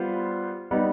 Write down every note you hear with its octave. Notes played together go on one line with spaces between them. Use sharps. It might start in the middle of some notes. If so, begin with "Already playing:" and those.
Already playing: G3 B3 F4 C5
G3 B3 D#4